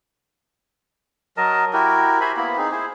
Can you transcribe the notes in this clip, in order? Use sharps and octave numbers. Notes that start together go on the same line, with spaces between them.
F#3 A#4 D#5 A5
E4 F#4 G4 A#4
C5 E5 G#5 B5
A#3 B3 E4 B5
C4 D#4 G#4
E4 G#4 C5